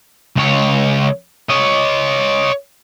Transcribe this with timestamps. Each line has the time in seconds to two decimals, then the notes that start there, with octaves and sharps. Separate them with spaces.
0.36 C#2 C#5
1.49 C#5 D#5